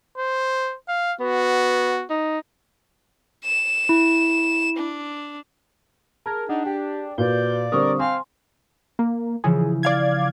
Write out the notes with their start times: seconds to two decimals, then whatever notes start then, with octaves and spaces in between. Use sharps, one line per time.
0.18 C5
0.88 F5
1.20 B3 F#4
2.10 D#4
3.44 E7
3.89 E4
4.76 D4
6.26 G#4 A#4 A5 F6 G#6
6.49 D4 D#4 F#5
6.66 G4 G5
7.18 A#2 F#4 B4 D5 G6
7.72 D3 G3 C4 A#4 C5 C#6 D#6
7.99 C4 F5 G#5 C6
8.99 A#3
9.44 C#3 E3 F3 G#4
9.83 D5 F5 G#6